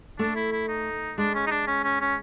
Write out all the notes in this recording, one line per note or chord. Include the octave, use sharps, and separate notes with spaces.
A3 D4
E4
E4
D#4
G#3 D4
C#4
D#4
D4
C#4
C#4
C#4